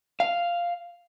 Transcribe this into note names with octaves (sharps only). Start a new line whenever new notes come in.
F5